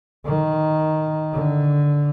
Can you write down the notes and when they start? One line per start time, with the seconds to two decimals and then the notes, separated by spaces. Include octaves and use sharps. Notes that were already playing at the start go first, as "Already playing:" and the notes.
0.25 D#3
1.33 D3